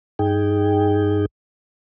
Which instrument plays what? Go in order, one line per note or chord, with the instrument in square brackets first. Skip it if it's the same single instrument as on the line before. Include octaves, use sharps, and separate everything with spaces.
[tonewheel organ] G2 D#4 G#4 G5